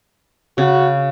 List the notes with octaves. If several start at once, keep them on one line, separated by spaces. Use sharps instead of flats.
C#3 F#4